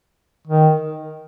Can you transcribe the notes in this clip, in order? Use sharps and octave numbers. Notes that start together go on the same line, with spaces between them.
D#3